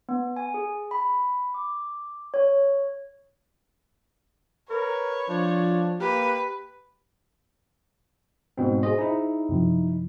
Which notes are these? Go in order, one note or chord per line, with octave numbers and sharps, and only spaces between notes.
B3
G#5
G#4
B5
D6
C#5
A#4 B4 C#5
F3 D4
A#3 G4 B4
G#2 B2 C4
G#4 C5 D#5
D#4 E4
F#2 C3 F3